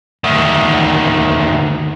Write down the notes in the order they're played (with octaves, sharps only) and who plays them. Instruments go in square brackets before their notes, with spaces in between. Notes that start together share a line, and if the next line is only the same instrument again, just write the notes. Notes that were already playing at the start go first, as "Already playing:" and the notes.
[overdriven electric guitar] D2 D#3